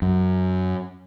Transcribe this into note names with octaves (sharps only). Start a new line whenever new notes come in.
F#2